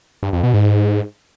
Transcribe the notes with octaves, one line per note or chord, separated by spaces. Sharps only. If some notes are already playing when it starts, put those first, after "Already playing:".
G2
F2
B2
G#2